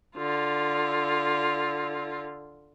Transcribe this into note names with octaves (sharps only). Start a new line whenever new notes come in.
D3 F4